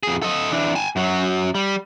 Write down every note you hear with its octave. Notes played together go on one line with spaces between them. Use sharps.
F2 G#4
A4 D#5
E3 D4
G#5 A5
F#2 F#3
G3